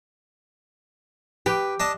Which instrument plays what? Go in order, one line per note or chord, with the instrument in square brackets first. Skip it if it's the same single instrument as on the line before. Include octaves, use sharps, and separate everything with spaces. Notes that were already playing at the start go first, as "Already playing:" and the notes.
[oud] G4 [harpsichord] B4
[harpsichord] D4 D#5 A5